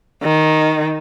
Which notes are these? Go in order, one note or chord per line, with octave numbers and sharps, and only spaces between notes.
D#3